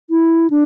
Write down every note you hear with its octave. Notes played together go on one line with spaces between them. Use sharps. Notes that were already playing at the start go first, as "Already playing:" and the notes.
E4
D4